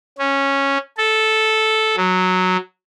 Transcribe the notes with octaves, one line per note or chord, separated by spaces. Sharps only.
C#4
A4
F#3